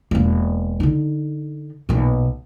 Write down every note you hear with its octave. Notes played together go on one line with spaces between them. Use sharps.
E1 A#3
D3 D#4
B1 A#2